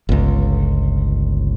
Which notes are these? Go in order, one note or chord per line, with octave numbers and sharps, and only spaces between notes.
G1 C#2